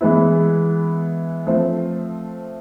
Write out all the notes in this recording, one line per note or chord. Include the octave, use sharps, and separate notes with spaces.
E3 G#3 B3 E4
F3 A3 C4